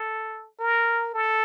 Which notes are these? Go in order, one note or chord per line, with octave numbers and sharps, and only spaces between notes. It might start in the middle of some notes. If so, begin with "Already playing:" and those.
Already playing: A4
A#4
A4